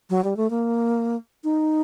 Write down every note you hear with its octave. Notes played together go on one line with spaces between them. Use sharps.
F#3
G3
A3
A#3
D#4